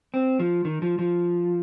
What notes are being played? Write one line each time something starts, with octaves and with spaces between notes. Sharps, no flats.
C4
F3
D#3
F3
F3